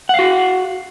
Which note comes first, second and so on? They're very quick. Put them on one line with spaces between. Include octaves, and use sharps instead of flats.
F#5 F5 F#4